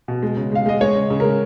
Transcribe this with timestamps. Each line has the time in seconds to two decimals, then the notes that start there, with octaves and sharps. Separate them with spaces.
0.08 B2
0.22 G#3
0.37 C#3
0.52 G#3 F5
0.66 G#3 D#5
0.81 G#3 C#5
0.96 C#3
1.10 C#3
1.20 G#3 A#4